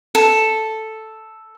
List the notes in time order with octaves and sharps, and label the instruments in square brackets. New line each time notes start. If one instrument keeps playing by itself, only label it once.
[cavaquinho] A4